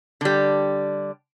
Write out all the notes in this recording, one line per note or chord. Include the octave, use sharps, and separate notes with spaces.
D3 G3